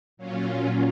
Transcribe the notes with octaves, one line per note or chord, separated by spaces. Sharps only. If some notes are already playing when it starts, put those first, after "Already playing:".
A#2 F#3 C#4 F4